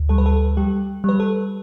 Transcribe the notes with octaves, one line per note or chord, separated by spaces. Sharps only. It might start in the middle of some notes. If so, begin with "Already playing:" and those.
Already playing: D2
G3 A4
B4
A4
G3 G4
G3 B4
A4